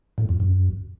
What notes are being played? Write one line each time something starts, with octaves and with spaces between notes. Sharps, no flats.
A2
F2
F#2